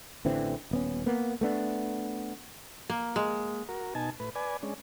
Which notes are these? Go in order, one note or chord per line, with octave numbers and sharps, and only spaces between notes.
A1 D3 E3 C4
D#1 B3 C#4
A#3 B3
A3 B3 D4
A#3
G#3
F#4 A#4
B2 D#4 G#5 A5
A2 B4
B4 D5 G#5
G#3 C#4 D4